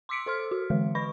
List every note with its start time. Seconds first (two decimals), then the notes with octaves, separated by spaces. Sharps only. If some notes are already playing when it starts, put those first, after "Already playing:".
0.09 C6 D6 E6 B6 C#7 D7
0.26 A4 C5 C6 F6
0.51 F#4
0.70 D3 E3 G#3
0.95 B4 B5 C#6 A#6